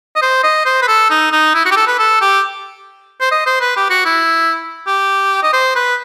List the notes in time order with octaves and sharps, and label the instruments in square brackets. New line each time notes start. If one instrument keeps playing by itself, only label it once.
[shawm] D#5
C5
D#5
C5
B4
A4
D#4
D#4
E4
F#4
G4
A4
B4
A4
G4
C5
D#5
C5
B4
G4
F#4
E4
G4
D#5
C5
B4